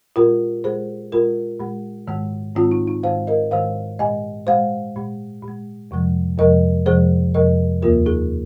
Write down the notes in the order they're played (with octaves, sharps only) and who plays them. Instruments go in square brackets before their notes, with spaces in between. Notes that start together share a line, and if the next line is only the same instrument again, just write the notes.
[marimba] A#2 G#3 F4 A#4
A#2 G#3 G#4 C5
A#2 G#3 F4 A#4
A#2 G#3
G#2 D#3 G#3
G#2 D#3 G#3 C4 F4
D#4
D#4
G#2 D#3 G#3 C5 F5
A#4 D#5
G#2 D#3 G#3 C5 F5
A#2 G#3 D#5 G#5
A#2 G#3 C5 F5
A#2 G#3
A#2
G#3
F2 C3 F3 G#3
F2 C3 F3 G#3 A#4 D#5
F2 C3 F3 G#3 G#4 C5
F2 C3 F3 G#3 A#4 D#5
D#2 D#3 A#3 F4 A#4
D#4 G#4